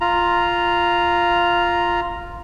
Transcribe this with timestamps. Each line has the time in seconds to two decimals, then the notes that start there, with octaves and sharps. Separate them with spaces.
0.01 F4 A#5